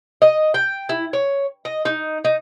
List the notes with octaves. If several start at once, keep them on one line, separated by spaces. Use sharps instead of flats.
D#5
G5
E4
C#5
D#5
D#4
D#4